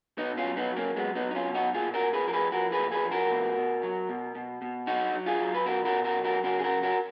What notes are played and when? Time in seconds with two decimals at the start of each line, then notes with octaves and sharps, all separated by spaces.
0.17 B2 B3 D#4
0.37 C#4 F4
0.44 F#3
0.57 B3 D#4
0.70 F#3
0.77 A#3 C#4
0.96 F#3 G#3 B3
1.15 B3 D#4
1.22 F#3
1.31 D#4
1.35 C#4 F4
1.48 B2
1.54 D#4 F#4
1.74 A#2 F4 G#4
1.94 F#4 A#4
2.01 A#2
2.13 G#4 B4
2.27 F3 A#4
2.33 G#4 B4
2.52 F3 F#4 A#4
2.72 G#4 B4
2.78 A#2
2.92 G#4 B4
3.05 F3
3.11 F#4 A#4
3.31 B2
3.57 B2
3.83 F#3
4.09 B2
4.35 B2
4.62 B2
4.87 F#3 D#4 F#4
5.14 F#3
5.26 F4 G#4
5.40 F#3
5.54 B4
5.66 B2 F#4 A#4
5.85 F#4 A#4
5.92 B2
6.05 F#4 A#4
6.18 F#3
6.24 F#4 A#4
6.44 C#3 F#4 A#4
6.59 G#4
6.64 F#4 A#4
6.70 F#3
6.83 F#4 A#4